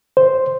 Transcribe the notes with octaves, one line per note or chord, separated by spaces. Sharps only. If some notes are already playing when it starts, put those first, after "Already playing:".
C5